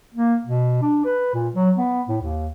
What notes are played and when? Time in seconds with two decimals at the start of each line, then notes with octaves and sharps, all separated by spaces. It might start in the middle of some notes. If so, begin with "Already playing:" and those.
0.14 A#3
0.46 B2
0.82 D4
1.05 B4
1.34 A#2
1.55 F#3
1.77 B3
2.08 A2
2.21 D#2